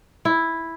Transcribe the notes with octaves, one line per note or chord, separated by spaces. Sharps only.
E4